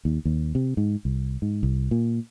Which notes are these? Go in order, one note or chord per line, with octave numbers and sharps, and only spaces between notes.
D#2
D#2
C3
G#2
C2
G#2
C2
A#2